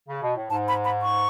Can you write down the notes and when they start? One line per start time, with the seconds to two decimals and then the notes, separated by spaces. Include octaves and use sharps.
0.09 C#3
0.23 B2
0.36 A2
0.50 G#2 A5
0.68 B5
0.84 B5
1.02 C#6